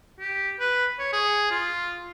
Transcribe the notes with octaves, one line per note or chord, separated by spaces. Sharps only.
G4
B4
C#5
G#4
F4